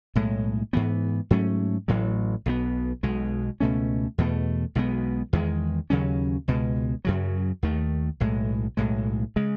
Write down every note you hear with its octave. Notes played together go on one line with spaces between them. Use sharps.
B1 A2 G#3
G#2 E3 B3
G#2 F#3 A3 C#4
A1 A2 F#3
B1 B2 F#3 B3
B1 B2 G#3
C#2 B2 A3 C#4
E2 B2 F#3 A3
B1 B2 G#3 B3
E2 D#3 G#3
D#2 C#3 F#3 C#4
C#2 B2 G#3
F#2 C#3 F#3
D#2 D#3 A3
B1 A2 G#3
B1 A2 G#3
C#3 G#3